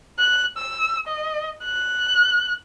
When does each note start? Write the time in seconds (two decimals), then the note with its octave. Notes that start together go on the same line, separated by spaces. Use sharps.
0.19 F#6
0.57 E6
1.07 D#5
1.65 F#6